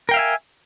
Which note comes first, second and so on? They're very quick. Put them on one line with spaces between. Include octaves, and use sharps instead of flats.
A#4 G5 F5 E5 G#5